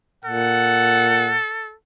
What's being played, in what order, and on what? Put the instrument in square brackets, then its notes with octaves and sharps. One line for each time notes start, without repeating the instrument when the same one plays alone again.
[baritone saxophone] A#2 [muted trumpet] A4 [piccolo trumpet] F#5